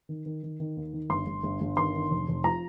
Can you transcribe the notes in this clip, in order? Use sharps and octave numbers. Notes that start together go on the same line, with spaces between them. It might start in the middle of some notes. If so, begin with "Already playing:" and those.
D#3
D#3
D#3
D#3
D#2
D#3
G1 C6
G1
G1
G1
D#3 C6
D#3
F1
F1
F3 A#5